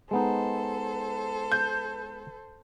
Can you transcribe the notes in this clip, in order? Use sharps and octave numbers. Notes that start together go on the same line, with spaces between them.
G#3 B3 D#4 A4 C5
G6